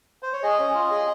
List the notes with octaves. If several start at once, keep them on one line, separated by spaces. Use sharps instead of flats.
C5
C#5
G#4 D#5
C#4
F4
G#4